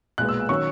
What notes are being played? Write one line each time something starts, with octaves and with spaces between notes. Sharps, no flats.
B1 A#2 G#3 B3 F#6
E6
D#3 F#3 C#4 C#6